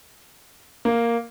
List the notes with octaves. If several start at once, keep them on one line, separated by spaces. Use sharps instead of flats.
A#3